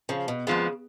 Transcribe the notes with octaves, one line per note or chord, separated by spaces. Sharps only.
C#3 F3
B2
F2 C#3 F3 G#3 B3